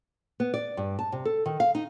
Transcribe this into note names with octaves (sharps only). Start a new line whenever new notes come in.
B3
D5
G2
A5
C3
A4
D#3
F5
D#4